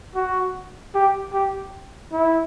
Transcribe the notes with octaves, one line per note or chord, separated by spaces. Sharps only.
F#4
G4
G4
E4